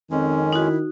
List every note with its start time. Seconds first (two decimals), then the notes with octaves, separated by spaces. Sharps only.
0.11 F2 D#3 G#3 C4 C#4
0.53 D#4 E4 F#4